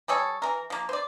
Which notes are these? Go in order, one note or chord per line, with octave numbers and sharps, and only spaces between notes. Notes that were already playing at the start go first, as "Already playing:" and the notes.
G3 G#4 A4 C#5
E3 A#4
F3 A#3
C5 D5